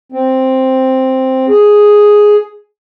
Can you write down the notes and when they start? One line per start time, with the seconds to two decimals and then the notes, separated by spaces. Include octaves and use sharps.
0.12 C4
1.48 G#4